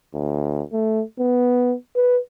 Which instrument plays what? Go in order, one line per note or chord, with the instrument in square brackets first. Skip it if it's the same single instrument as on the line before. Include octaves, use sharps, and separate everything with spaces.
[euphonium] D2
A3
B3
B4